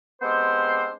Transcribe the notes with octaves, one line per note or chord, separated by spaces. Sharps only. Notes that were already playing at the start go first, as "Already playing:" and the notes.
G#3 B3 C4 D4 G4 C5